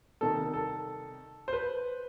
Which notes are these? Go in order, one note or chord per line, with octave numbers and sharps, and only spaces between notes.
C3 D#3 G3 A4
A4
C5
B4